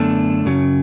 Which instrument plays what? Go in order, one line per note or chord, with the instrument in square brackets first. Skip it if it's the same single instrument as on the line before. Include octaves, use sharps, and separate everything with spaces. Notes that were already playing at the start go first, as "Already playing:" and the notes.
Already playing: [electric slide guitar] F#2 D3 A3 D4 [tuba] B3
[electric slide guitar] F#2 C#3 F#3 [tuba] C#4